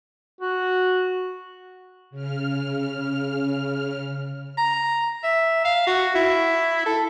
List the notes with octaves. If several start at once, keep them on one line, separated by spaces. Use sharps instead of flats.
F#4
C#3 F6
A#5
E5
F5
F#4
E4
A4